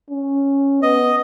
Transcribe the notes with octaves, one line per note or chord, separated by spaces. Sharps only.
C#4
B3 D#5